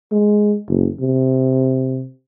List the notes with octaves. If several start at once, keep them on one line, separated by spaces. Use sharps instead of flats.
G#3
F#1
C3